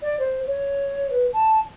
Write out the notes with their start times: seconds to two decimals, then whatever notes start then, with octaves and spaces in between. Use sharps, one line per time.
0.02 D5
0.19 C5
0.47 C#5
1.10 B4
1.33 A5